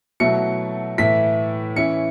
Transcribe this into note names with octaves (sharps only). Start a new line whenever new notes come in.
B2 F#3 A3 E4 C#7
A2 E3 A3 E4 B6
E3 C#4 E4 C#7